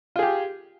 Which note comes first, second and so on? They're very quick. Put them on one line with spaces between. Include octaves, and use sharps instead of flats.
F4 G#4 G4